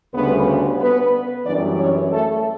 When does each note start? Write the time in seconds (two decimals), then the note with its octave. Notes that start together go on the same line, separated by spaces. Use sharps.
0.14 D2 C#3 G3 B3 D4 B4
0.80 B3 B4
1.46 F#2 E3 G3 D4 D5
1.80 C#4 C#5
2.12 A3 A4